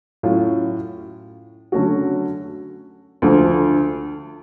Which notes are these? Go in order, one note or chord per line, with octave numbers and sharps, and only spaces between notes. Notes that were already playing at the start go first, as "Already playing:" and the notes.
A2 F#3 C#4 F4
D3 F#3 A3 C#4 F#4
D2 D3 F3